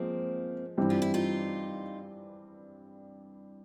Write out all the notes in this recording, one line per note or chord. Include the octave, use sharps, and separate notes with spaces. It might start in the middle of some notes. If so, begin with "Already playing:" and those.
Already playing: F3 G#3 A#3 C4
G2 E3 G3 C4
F4
E4
D#4 F4